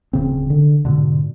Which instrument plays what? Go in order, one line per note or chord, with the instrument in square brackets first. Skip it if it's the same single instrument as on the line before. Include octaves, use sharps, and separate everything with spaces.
[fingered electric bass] D1 C#3 C4
D3
G#2 B2 D3